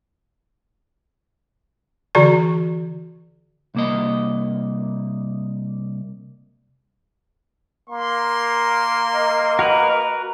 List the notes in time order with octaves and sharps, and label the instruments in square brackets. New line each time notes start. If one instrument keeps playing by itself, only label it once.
[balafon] D3 E3 F#4 D5 C#6
[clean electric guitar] C2 A#3 D#5
[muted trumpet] A#3 [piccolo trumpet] C6
[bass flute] D#5
[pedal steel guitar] F#4 A#4 B4